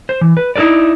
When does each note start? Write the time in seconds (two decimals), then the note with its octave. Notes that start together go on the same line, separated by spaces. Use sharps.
0.09 C5
0.21 E3
0.37 B4
0.56 D#4 E4 A4 B4 D5